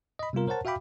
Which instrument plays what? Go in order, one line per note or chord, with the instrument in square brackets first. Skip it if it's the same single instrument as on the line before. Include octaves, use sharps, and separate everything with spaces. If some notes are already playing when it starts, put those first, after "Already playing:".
[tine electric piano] D#5 B5
C3 G3 B3 F4 A#4
A#4 C5 C#5 F#5 A5
F#4 E5 F5 G5 B5 D6